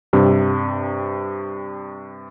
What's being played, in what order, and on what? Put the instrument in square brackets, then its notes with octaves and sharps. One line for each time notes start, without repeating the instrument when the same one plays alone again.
[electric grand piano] G2 C3